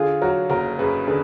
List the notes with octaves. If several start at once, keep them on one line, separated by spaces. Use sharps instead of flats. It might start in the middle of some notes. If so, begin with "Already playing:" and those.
Already playing: D3 F4 G#4
F#3 F#4 A#4
F#1 F#4 A#4
F#2 G#4 B4
D3 G#4 B4